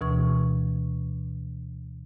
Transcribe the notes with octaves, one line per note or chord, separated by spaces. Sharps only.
D2 B2 E3 C#6